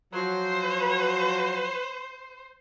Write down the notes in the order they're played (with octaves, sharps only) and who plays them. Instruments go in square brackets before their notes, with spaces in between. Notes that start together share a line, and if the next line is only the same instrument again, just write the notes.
[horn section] F3 F#3 [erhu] C5